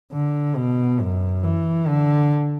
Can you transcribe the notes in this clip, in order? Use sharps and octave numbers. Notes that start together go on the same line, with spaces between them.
D3
B2
F#2
E3
D3